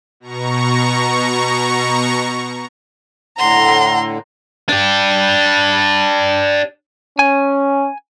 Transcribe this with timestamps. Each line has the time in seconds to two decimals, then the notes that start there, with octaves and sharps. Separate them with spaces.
0.20 B2 A#5 C#6
3.39 A2 D3 F#5 A#5 C6
4.69 D4 G4
7.19 C#4 G#5